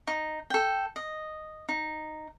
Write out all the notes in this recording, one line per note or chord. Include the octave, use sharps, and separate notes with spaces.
D#4
A4 G5
D#5
D#4